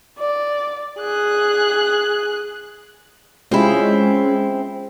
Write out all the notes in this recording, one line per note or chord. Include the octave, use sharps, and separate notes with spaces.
D5
G#4 F#6
G#3 C4 C#4 E4 F4 G4 G#4